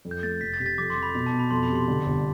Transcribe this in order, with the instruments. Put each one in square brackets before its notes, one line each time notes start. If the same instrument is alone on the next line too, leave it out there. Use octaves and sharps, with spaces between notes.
[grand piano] F2
[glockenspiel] G6
[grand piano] A3 [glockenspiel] A6
[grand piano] F1 [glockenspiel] B6
[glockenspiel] A6
[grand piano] C3 [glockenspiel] B6
[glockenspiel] A6
[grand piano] F2 [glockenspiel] D6
[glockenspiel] C6
[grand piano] F2
[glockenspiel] B5
[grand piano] B2 [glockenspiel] B5
[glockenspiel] A5
[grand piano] B2
[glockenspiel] B5
[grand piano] F2 [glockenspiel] C6
[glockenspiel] B5
[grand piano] C3
[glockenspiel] C6
[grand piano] D3
G1